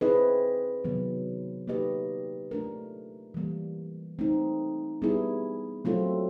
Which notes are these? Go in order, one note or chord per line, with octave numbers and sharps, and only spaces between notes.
C4 E4 G#4 B4 D#5
C3 D#3 F#3 B3
A#3 D#4 G4 B4 D#5
A3 D4 F4 A#4
E3 G3 A#3
A3 C4 D#4
G3 B3 E4 G#4
F#3 A3 C4 F4 A4